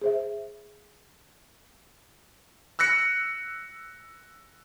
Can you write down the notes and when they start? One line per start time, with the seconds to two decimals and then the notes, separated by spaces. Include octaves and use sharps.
0.02 G#4 C5 E5
2.79 E6 F#6 A#6 C#7